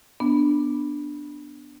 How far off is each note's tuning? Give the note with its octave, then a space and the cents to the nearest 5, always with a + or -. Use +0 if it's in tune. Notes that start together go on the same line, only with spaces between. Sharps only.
B3 +0 D4 +0